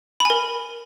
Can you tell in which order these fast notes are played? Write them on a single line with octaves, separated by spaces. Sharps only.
B5 G#5 A#4